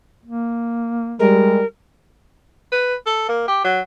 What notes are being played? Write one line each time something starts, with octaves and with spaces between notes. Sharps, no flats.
A#3
G3 G#3 A#4
B4
A4
A#3
G4
F#3